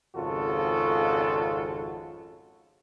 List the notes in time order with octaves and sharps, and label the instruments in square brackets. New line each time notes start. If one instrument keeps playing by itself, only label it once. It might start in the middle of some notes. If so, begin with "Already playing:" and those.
[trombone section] G#1 F2 C#3 F4 F#4 A4